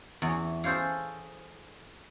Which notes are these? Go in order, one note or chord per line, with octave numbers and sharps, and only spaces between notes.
E2 C#5
G#4 A4 C5 C#5 F5